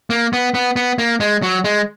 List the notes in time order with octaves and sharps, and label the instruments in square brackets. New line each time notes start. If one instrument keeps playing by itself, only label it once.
[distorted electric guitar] A#3
B3
B3
B3
A#3
G#3
F#3
G#3